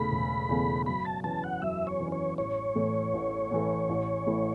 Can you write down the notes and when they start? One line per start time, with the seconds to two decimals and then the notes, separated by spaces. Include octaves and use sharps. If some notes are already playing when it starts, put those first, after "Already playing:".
Already playing: E1 E2 C#3 A3 B5
0.12 E1
0.49 E2 C#3 A3
0.86 F#2 B5
1.05 A5
1.24 E3 C#4 A5
1.44 F#5
1.62 F#2 E5
1.87 C#5
2.00 E3 C#4
2.12 C#5
2.37 A1 C#5
2.75 A2 E3 A3
3.13 A1
3.51 A2 E3 A3
3.89 A1
4.27 A2 E3 A3 E4